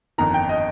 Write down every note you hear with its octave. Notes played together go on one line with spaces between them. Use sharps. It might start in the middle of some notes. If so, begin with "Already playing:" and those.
G1 F2 D#3 A#5
G5
D#5